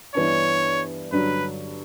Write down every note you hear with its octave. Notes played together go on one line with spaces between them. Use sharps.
G2 E3 B3 D4 C#5
G2 D3 F#3 B4